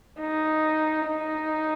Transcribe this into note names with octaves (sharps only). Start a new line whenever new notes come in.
D#4
D#4